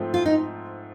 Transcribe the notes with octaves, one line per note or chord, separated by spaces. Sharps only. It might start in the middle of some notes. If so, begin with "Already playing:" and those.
Already playing: G#2 F3 A3 C4
F4
D#4